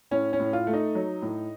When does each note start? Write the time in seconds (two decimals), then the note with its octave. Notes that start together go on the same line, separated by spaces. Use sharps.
0.11 A2 C#4
0.33 C#4
0.40 A2
0.53 F4
0.67 A3
0.73 D#4
0.95 F#3
1.22 A2